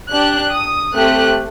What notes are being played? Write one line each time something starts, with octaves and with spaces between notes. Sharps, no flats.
D4 G4 F#6
D#6
A3 C4 G4 F#6